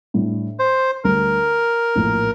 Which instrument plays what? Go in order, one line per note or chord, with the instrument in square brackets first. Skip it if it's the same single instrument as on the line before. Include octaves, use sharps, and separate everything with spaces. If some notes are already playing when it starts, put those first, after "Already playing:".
[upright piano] A2 G3 D4
[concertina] C5
[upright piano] D2 D3 G3 [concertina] A#4
[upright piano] A#1 A2 F3 A#3